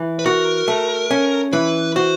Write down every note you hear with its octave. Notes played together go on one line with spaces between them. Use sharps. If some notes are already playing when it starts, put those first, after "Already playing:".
Already playing: E3
B4
F#4 A#4
A3
C#4
E3 B4
F#4 C5